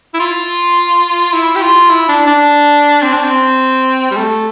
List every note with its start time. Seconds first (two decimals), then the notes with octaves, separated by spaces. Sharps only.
0.14 E4
0.20 F4
1.33 E4
1.56 G4
1.62 F4
1.90 E4
2.09 D4
2.27 D4
3.02 C4
3.13 D4
3.24 C4
4.11 G3
4.16 A3